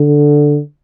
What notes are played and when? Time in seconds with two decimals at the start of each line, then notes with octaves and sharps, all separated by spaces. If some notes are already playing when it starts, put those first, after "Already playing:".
Already playing: D3